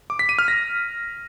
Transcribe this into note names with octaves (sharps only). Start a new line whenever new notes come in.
D6
B6
D#7
F6
A#6